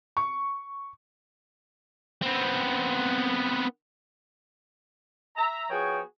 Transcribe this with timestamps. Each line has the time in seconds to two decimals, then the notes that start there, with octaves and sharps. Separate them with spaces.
0.17 C#6
2.22 B3 C4
5.36 E5 A#5
5.70 F3 B3 F#4 G#4 C#5 G5